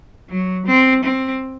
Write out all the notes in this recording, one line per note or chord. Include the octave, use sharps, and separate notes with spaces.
F#3
C4
C4